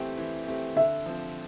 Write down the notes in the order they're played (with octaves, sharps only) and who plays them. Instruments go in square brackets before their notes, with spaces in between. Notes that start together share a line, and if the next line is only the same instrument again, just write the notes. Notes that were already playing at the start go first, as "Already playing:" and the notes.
Already playing: [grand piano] E3 A3 C4 G4
E3
A3 C4 G4
[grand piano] D3 [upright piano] E5
[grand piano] F3 C4